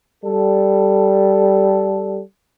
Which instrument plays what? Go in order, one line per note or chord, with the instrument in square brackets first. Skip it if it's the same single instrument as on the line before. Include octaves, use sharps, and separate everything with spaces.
[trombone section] G3 A4